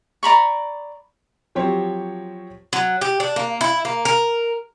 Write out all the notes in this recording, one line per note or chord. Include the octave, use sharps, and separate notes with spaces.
D5 A#5 B5 C#6
F3 F#3 C4 G4 C5 C#5
F#3
G4
D4
A#3
E4
A#3
A#4